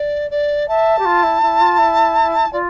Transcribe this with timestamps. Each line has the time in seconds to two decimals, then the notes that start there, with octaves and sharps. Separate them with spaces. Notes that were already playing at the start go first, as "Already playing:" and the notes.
Already playing: D5
0.30 D5
0.68 E5 A5
0.98 G4
1.05 F4
1.23 E4
1.42 E4
1.60 F4
1.78 E4
2.52 F4 D5